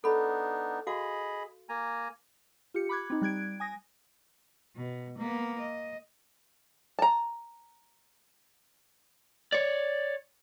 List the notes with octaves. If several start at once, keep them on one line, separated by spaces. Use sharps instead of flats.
B3 D4 D#4 A4 B5
F#4 G#4 D#5 F5 B5
A#3 G#5 A#5
F4 G4 C#7
B5 D6 F#6 G#6
C4 D#4
G3 F#6 G#6 D7
G#5 D#6 A#6
B2
A#3 B3
D#5
A5 A#5
C#5 D5